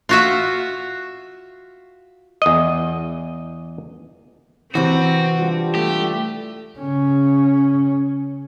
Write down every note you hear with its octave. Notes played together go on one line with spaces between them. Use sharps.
F4 F#4 E5
E2 D#5
C3 E3 C4 F#4
G3 D4 F4
A3 G4
C#3 C#4